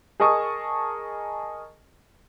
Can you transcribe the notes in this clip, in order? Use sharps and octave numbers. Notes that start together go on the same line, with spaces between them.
G#4 A#4 D#5 A5 C#6 D#6